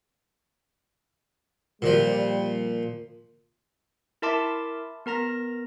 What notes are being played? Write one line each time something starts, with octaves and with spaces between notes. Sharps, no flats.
A#2 F3 G3
E4 A#4 E5 A5 C6 D6
B3 A#4 A#5 A#6